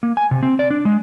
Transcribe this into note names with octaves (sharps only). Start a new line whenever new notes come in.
A#3
G#5
C3
C4
D5
D4
G#3